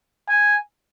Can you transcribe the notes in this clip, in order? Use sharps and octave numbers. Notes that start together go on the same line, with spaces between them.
G#5